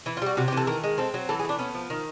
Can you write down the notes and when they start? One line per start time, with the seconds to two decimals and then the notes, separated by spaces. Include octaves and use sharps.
0.06 E3 E4
0.17 F4
0.22 G3 F#4
0.37 C3 F#4
0.48 G4
0.52 E3
0.57 A4
0.67 D#3 A#4
0.84 G#3
0.98 C4 A4
1.14 F#3
1.29 E3 A4
1.39 G#4
1.45 A3 D4
1.59 B3 C#4
1.74 F3
1.90 D#3